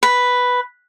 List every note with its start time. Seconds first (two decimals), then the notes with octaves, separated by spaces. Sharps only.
0.03 B4